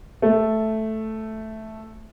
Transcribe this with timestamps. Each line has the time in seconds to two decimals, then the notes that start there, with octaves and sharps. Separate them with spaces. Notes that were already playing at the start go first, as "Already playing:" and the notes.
0.22 A3